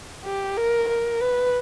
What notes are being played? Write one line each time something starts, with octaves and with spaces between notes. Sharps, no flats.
G4
A#4
A#4
B4